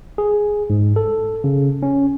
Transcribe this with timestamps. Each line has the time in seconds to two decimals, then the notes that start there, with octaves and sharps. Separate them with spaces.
0.18 G#4
0.70 G#2
0.96 A4
1.44 C#3
1.83 C#4